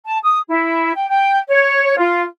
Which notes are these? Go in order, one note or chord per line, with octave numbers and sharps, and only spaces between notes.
A5
D#6
E4
G5
G5
C#5
F4